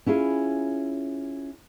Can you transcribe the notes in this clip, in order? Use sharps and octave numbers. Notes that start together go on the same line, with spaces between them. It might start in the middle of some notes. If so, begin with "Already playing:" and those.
C#4 E4 F4 G#4